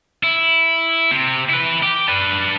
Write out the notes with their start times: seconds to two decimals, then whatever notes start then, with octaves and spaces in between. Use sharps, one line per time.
0.23 E4
1.11 C3 C4
1.50 E4 B4
1.83 G4
2.08 D4 B4